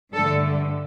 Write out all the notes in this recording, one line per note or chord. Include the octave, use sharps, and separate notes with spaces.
G2 D3 A3 A4